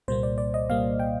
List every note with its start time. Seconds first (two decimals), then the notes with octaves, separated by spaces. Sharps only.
0.08 C2 A#2 G3 A#3 C5
0.23 D5
0.38 D5
0.54 D#5
0.69 C2 A#2 G3 A#3 F5
1.00 G5